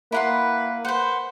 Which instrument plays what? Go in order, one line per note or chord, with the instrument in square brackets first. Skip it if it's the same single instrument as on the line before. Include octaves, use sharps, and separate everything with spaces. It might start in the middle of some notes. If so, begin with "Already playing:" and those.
[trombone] A#3 [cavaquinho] E4 F#5 C6 [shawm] B4
[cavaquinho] B4 F#5 [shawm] C5